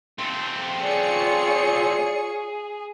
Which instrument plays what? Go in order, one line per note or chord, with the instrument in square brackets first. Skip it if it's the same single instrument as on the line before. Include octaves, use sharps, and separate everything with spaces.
[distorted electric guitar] A3 C4
[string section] F4 C#5 C#7 [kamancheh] G#4 [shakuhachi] D5